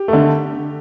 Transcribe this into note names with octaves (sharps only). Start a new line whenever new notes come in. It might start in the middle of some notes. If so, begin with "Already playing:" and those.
Already playing: G4
D3 A3